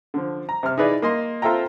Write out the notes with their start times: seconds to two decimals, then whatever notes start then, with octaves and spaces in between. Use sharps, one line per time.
0.14 D3 F3
0.49 A#5
0.63 C3 F6
0.78 D#4 E4 G#4 B4 D5
1.02 A#3 D#5 C6
1.42 C4 F4 A4 E5 G5 A#5